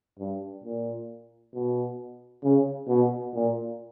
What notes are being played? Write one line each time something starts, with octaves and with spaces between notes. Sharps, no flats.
G2
A#2
B2
C#3
B2
A#2